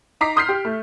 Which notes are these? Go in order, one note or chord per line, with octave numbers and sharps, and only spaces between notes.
D#4 D#5 A#5 D6 B6 C7
C6 D#6 F6 G6 B6 C7
G4
A3